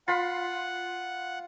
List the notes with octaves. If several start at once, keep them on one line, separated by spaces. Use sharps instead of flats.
F4 F#5 B5 C6